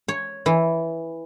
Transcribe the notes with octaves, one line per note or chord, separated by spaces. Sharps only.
C#5
E3